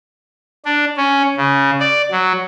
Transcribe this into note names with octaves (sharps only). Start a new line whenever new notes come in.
D4
C#4
C#3
D5
F#3